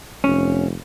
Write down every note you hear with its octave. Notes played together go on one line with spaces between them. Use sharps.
F1 C#4